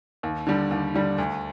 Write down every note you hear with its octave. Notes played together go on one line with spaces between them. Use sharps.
D#2
D3 G3
D#2
D3 G3
D2